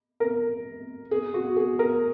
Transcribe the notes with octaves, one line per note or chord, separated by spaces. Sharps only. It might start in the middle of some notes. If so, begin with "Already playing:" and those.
A#4
G#4
F#4
G#4
A#4